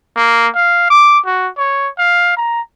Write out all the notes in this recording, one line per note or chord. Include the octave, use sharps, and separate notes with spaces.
A#3
F5
D6
F#4
C#5
F5
A#5